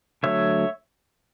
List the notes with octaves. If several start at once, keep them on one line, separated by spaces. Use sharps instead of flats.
D3 F#3 A3 C#5 E5